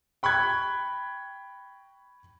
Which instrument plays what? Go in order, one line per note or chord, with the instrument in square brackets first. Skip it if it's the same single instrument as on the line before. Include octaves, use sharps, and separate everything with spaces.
[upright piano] G5 B5 C#6 F#6 G#6